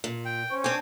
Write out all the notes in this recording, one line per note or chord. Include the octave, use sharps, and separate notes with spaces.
A#2
G5
C#4 C5 C#6
C4 D4 G5 G#5 D6